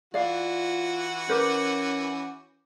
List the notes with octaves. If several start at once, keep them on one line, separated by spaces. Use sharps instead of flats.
E3 F4 F#4 D5 F5
C#4 A#4 B4 D6 G6